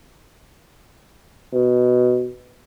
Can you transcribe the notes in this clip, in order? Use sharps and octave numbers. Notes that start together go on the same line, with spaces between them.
B2